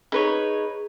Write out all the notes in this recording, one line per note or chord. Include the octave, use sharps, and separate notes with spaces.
D#4 G#4 B4 C#5